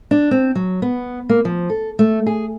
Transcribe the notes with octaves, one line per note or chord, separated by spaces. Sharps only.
D4
C4
F#3
B3
A#3
F3
A4
A3
G#4